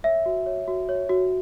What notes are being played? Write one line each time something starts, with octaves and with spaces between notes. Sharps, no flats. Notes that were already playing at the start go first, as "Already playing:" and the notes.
C#5 E5
F#4
C#5
F#4
C#5
F#4